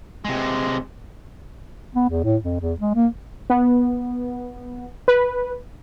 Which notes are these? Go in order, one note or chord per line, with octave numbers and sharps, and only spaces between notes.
C3 G#3
B3
E2
A2
F2
E2
G#3
A#3
B3
B4